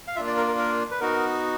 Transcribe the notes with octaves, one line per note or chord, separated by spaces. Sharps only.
F5
A#3 D4 F4 E5
D5
A#4
A#4
A#4
B4
B3 D#4 F#4 A#4